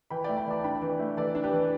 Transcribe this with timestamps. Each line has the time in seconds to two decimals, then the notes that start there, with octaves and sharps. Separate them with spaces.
0.10 E3 G5 B5
0.24 D5 G5
0.29 A3
0.37 G5 B5
0.47 E3 A5 D6
0.64 D4 G5 B5
0.82 E3
1.00 A3
1.17 E3 A4 D5
1.35 D4
1.44 G4 B4
1.53 E3